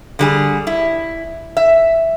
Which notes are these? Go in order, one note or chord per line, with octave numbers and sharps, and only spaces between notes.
D3 G3 G#4
E4
E5